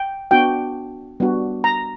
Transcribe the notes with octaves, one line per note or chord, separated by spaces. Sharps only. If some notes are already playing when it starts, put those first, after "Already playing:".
Already playing: G5
B3 D4 F#4 G5
G3 B3 D4 F#4
A#5